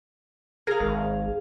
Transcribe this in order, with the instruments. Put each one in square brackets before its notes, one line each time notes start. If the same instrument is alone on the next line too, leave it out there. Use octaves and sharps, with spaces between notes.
[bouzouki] G#4 F5 [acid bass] A#4
[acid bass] G#1